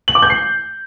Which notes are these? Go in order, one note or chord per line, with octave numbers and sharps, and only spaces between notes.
F#7
D6
G6
C7